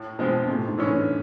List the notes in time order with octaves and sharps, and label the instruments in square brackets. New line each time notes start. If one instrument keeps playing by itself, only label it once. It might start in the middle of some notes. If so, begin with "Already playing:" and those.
Already playing: [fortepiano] A2
[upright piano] B2 [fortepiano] F3 G#3 C4
[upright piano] A2 [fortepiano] C3
[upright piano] G#2
[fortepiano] E3 G#3 C#4
[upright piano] D3